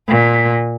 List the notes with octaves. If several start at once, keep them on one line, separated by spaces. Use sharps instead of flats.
A#2